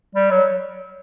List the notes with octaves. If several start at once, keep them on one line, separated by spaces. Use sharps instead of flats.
G3
F#3